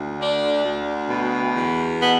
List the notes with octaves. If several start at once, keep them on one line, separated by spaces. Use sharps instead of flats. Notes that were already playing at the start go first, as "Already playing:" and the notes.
Already playing: D2
D3 D4
D2
B2
E2
B2 B3